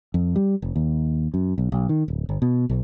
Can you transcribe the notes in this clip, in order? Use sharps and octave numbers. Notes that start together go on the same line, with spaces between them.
F2
G3
F1
D#2
F#2
B1
B1
D#3
D1
G1
B2
B1